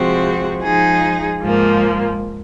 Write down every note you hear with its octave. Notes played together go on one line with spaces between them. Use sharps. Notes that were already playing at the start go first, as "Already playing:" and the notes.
Already playing: C3 F3 G#3 C4 F#4
F3 G#3 D#4 G#4
G#2 F3 A#3